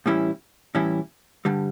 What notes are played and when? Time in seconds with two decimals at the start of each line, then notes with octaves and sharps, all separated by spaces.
0.06 A2 E3 G3 C#4 E4
0.75 A2 E3 G3 C#4 E4
1.45 G2 D3 G3